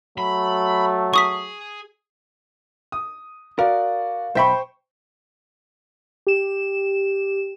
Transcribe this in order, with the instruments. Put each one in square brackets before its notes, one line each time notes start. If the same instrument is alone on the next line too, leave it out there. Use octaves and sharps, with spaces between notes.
[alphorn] F#3 [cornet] A3 [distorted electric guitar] B5
[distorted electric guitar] G#4 [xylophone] C#6 D#6 B6
[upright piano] D#6
[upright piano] F#4 D5 [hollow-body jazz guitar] A#4 [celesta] F5
[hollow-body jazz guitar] B1 E5 B5 [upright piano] C5 G5 C#6
[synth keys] G4 E7